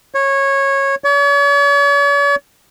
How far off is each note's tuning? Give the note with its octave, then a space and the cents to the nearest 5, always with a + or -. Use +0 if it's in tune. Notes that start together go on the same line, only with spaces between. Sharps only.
C#5 -15
C#5 +45